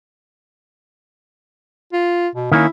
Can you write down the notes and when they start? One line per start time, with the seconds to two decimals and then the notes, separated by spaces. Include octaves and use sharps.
1.92 F4
2.35 B2
2.52 D#3 A#3 C#4 E4